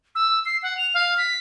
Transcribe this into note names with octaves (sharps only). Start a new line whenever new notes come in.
E6
C7
F#5
F7
F5
B6